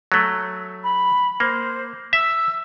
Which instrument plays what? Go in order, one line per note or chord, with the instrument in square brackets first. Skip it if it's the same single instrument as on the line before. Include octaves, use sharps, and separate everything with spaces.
[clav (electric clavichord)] F#3 A3
[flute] B5
[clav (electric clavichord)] A#3 [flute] C5
[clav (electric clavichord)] E5 [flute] E6